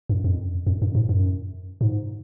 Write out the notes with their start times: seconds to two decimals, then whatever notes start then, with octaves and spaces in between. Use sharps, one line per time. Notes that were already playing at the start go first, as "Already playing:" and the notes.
0.09 F#2
0.24 F2
0.67 F2
0.82 F#2
0.95 G#2
1.09 F#2
1.81 G#2